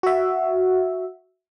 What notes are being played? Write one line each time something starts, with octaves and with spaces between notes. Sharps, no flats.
F#4 E5